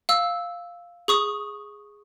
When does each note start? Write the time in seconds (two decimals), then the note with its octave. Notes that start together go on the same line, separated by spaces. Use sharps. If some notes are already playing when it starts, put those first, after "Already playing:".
0.09 F5 E6
1.08 G#4 C#6 D#6